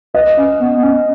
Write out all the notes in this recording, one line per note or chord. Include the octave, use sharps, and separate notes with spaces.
B4 D#5
C#4
B3
B3
C#4